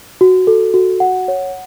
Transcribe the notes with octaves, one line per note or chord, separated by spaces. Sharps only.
F#4
A4
F#4
F#5
C#5